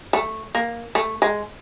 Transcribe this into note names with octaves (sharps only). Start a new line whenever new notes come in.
A3
A#3
A3
G#3